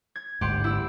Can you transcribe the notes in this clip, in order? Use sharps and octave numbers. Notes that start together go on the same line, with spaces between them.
G#6
G#1 D2 G#2 G4 F#5 C6
E4 E6